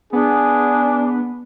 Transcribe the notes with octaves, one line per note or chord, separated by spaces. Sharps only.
B3 D4 G#4